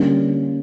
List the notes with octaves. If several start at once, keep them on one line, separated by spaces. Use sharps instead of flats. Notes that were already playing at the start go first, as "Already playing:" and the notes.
Already playing: D3 G3 A#3 C#4